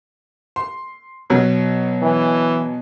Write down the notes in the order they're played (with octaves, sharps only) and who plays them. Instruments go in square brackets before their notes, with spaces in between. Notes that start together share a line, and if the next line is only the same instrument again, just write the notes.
[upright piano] C6
B2 F#3
[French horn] E3